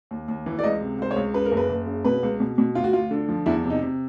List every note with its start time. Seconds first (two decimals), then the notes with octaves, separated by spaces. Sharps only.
0.11 D#2
0.28 D#2
0.46 E3
0.59 D5
0.63 C#2 D#5
0.81 C3
0.99 C#2 C5
1.11 C#5
1.16 C#2
1.34 C#3 B4
1.45 A#4
1.52 F#1
1.57 B4
1.69 F#1
1.87 C#3
2.04 B2 B4
2.23 C#2
2.40 B2
2.58 B2
2.75 D2 F4
2.84 F#4
2.93 D2 F4
3.11 D3
3.29 F3
3.46 E2 E4
3.64 C3
3.70 D#4
3.82 C3